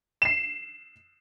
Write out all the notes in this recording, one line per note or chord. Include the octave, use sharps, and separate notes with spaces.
C7 E7